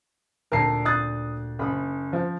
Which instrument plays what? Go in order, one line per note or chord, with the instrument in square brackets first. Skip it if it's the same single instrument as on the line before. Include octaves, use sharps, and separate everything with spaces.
[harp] D2 A#2 D3 [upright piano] A#4 A5 C7
[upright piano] D#6 F#6 A6
[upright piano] F#1 [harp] B5 D#6
[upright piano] F3